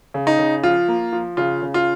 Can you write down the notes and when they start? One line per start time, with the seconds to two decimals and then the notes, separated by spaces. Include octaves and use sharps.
0.14 C#3
0.27 D#4
0.38 C#3
0.63 F3 F4
0.88 A#3
1.13 F3
1.37 C#3 F4
1.62 C#3
1.74 F4